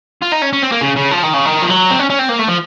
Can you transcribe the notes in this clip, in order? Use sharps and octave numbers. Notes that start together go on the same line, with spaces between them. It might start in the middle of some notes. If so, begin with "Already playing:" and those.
F4
D#4
C#4
C#4
C4
A#3
C#3
C#3
F3
D#3
C#3
D#3
F3
F#3
C4
C#4
C#4
C4
A#3
A3
F3